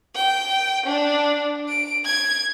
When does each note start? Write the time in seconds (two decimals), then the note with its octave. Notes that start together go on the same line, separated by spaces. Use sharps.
0.15 G5
0.86 D4
1.68 D7
2.05 G#6